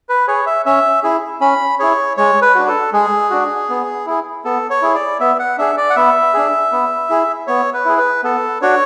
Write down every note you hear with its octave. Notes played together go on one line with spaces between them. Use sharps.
B4
G#4 C#5
E5
C#4 E5
E4 G#4
C#4 B5
E4 G#4 C#5
G#3 C#5
B4
D4 F#4
A4
G#3 G#4
D4 F#4
B3
E4 G#4
B3 A4
C#5
E4 G#4
D5
B3 E5
F#5
D4 G#4 E5
D5
F#5
B3 E5
D4 G#4
B3
E4 G#4
B3 C#5
B4
E4 G#4
B4
B3 A4
D4 F#4 C#5